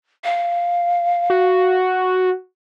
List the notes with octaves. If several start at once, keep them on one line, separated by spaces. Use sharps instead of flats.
F5
F#4